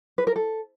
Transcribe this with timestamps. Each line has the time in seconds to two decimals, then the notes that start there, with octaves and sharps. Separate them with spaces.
0.18 B4
0.27 A#4
0.36 A4